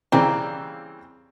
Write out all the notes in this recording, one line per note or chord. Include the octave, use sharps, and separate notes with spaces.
C#3 E3 G3 A#3 C4 G4